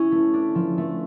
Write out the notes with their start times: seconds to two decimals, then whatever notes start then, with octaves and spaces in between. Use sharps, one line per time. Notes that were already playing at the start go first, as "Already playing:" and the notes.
Already playing: C#4 E4
0.12 A3
0.34 D4
0.55 F3
0.78 A3